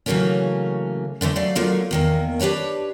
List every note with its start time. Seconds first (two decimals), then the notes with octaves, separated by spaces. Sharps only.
0.06 C#3 E3 F#3 A3 A#3 C#4
1.21 A2 D3 E3 A3
1.36 F#3 A3 D5 F5
1.55 D3 F#3 A3 A#3 F4
1.91 E2 D#3 A#3
2.40 D4 G4 B4 C#5 A5